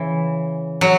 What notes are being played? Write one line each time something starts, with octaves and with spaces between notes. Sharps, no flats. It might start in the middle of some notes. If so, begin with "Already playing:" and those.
Already playing: C#3 E3
F#3